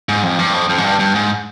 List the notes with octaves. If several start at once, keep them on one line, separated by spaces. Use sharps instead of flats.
G#2
F2
G2
F2
F2
G#2
G2
G2
G#2